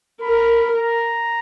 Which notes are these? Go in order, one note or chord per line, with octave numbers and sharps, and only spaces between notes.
A#4 B5
A#5